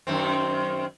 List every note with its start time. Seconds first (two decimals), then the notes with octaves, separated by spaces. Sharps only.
0.07 F#2 D#3 C4